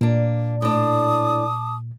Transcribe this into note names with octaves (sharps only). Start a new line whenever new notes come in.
A#2 A#3 D4
A2 D4 A5 D6 D#6